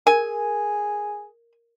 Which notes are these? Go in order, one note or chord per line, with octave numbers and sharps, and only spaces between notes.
G#4 A#4 G#5